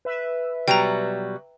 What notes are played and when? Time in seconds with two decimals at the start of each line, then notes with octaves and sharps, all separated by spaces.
0.05 B4 E5
0.68 B2 F#3 G3 G5 A#5